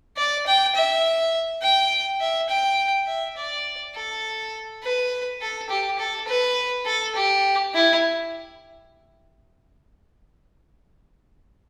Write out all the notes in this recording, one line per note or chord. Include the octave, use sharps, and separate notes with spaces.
D5
G5
E5
G5
E5
G5
E5
D5
A4
B4
A4
G4
A4
B4
A4
G4
E4